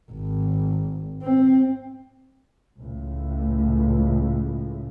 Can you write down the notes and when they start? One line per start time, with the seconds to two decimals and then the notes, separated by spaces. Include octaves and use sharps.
0.11 G#1
1.23 C4
2.82 C#2 A2